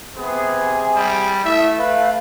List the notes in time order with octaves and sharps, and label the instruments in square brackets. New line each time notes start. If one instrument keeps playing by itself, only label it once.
[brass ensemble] C3 G#4 [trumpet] B3
[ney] G#5
[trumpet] G3
[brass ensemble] A3 [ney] E4 [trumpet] E5
[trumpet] B4 [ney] F5